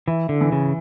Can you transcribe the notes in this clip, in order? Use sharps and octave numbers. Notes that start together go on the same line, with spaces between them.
E3 E4
D3
E3
C#3